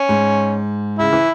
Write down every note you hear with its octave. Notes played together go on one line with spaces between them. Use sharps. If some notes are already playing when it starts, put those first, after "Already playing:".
Already playing: C#4
G#2
C#3 E4
E3